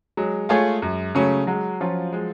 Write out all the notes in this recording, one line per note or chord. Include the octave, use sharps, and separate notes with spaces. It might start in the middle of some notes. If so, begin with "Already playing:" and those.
F#3 G#3
A3 F4 G#4 C#5
F#2
C#3 F#3 A3 C#4
F#3 G#3
F3 C#4 F4
G#3